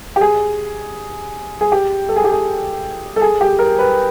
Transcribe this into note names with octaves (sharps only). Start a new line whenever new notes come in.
G4
G#4
G#4
G4
A4
G#4
G4
G#4
A4
G#4
G4
A#4
B4